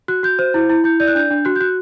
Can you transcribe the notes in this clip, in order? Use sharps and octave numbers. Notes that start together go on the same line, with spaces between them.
F#4 F#6
F#4 G6
C5
E4
E4
E4 G6
D5 G6
F#6
D4 G6
D4
F#4 F#6
G6
F#4 F#6